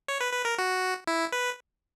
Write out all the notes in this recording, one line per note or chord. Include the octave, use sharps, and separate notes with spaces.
C#5
B4
B4
A#4
F#4
E4
B4